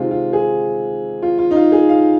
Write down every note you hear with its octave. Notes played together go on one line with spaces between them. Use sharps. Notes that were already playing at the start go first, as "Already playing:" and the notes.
Already playing: C3 D#3 G#3 C4 F4
F4
G#4
F4
F4
D#4
F4
G#4
F5